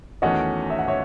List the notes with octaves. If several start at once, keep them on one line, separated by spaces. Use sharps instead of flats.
E2 D#3 A3 C#4 F#4 D#5 F#5
E5
F#5
C#5 E5